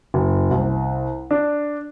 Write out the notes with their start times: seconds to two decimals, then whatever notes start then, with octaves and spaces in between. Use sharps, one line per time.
0.14 F#1
0.51 C2
1.31 D4